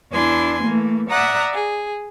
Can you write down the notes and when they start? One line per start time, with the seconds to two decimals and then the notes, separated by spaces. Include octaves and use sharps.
0.11 E2 D4 E4 G#5 C6
0.63 E3 A3 A#3
1.10 D5 E5 F#5 A#5 D#6 F#6
1.53 G#4